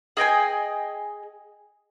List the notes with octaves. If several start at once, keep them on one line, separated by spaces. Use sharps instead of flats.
G#4 D#5 G5 G#5